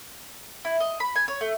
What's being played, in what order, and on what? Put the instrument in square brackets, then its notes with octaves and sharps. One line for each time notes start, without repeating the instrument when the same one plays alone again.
[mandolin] E4
D#5
B5
G#5
C#5
A3